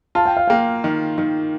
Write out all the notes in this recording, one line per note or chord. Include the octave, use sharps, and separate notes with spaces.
F4 A5
G5
F5
A#3 G5
D#3
D#3